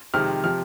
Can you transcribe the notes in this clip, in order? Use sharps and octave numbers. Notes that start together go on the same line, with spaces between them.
F2 C3 D#3 G#3 F6
C3 F3 F6